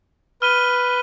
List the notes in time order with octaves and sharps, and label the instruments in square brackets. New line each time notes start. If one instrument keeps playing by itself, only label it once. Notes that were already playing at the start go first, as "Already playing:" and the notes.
[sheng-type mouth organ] B4 [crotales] F6 D#7 G7